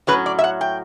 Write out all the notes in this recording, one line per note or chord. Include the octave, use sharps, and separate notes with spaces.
A2 F#3 C#4 B4
D5
E5
F#5
G5